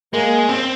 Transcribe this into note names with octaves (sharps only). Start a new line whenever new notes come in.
G#3 A#3
C4